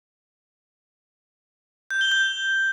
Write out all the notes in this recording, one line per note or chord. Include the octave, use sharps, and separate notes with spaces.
G6
G7
G6